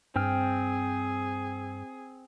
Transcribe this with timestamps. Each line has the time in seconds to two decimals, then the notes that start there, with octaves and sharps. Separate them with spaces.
0.16 G2 C4 G#4 G5 F6